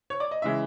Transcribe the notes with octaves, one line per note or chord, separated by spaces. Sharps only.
C#5
D5
D#5
C#3 E3 G#3 E5